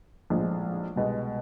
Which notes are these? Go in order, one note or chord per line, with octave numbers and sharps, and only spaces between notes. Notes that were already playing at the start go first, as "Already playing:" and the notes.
A#1 A2 F3 G#3
C2 B2 G#3